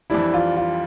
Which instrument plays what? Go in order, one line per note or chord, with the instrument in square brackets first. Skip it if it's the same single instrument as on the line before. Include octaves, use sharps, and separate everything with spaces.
[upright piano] F2 E3 G3 D4 [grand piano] E4
[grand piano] F4
F4